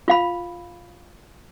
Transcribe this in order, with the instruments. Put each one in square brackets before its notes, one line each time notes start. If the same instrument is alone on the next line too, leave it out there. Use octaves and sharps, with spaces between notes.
[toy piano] F4 F5 B5